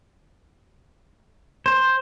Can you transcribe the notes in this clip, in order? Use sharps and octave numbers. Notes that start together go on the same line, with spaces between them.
C5